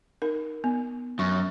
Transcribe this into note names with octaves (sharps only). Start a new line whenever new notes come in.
D#4 A#4
B3
F#2 C#6